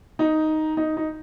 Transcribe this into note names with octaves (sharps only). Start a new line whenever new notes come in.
D#4
D#4
D#4